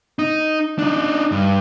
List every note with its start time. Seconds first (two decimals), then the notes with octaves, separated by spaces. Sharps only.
0.19 D#4
0.79 D4 D#4
1.31 G2